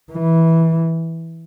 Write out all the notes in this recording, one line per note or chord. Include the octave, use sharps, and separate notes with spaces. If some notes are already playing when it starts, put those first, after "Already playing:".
E3